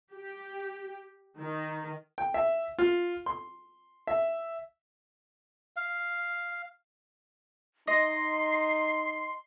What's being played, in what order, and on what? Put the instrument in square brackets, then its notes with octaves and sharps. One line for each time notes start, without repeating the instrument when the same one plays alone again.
[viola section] G4
D#3
[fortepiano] G5
E5
F4
C6
E5
[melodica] F5
[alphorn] D#4 [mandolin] D#5 [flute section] C6 [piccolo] C7